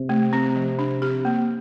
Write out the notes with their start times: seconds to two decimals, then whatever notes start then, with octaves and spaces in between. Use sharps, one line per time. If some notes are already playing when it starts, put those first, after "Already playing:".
Already playing: C3
0.09 A3
0.33 C4
0.56 F3
0.79 D4
1.02 G4
1.25 A#3